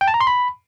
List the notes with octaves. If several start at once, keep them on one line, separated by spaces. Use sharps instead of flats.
G5
A5
A#5
C6
B5